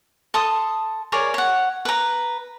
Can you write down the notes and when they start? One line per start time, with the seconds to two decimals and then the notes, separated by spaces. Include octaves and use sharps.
0.34 A4 C6 D#6
1.12 G#4 A#4 C#5 D5
1.34 C#5 F#5
1.85 B4 A#5